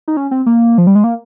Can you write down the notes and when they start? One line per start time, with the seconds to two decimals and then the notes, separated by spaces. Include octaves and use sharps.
0.08 D#4
0.17 C#4
0.31 C4
0.46 A#3
0.78 F3
0.87 G3
0.95 G#3
1.04 A#3